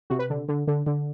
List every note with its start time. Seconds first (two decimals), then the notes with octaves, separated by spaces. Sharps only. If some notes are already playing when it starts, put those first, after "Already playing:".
0.10 C3 F#4
0.19 B4
0.30 D3
0.49 D3
0.68 D3
0.86 D3